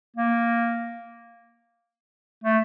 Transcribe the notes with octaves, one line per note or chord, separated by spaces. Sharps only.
A#3
A3